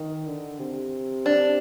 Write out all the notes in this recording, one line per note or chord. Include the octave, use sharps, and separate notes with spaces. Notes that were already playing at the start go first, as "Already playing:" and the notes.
Already playing: D#3
D3
C3
D4